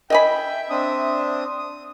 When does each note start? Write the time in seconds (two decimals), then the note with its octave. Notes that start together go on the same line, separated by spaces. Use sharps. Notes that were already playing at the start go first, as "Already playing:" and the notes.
0.10 D#5 E5 G5 G#5 B5
0.70 C4 D4 D#6
1.58 D#6